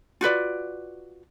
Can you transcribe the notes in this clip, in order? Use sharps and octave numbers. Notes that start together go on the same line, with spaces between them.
F4 F#4 B4 D5